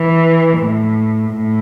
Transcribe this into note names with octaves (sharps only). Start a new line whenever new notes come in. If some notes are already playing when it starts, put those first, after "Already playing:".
Already playing: E3
A2
A2